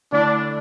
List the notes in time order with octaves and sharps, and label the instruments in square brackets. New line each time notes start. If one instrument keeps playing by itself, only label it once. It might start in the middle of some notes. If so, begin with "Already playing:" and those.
[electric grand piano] D3 A3 E4 [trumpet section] D4